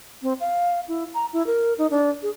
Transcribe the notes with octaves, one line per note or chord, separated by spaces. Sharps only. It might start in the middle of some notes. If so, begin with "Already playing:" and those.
C4
F5
E4
A#5
E4
A#4
D#4
D4
G#4